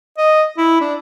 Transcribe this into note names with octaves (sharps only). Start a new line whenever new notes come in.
D#5
E4
D4